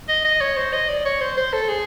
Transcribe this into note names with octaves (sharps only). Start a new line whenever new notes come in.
D#5
D#5
C#5
C5
D#5
D5
C#5
C5
C5
A4
G#4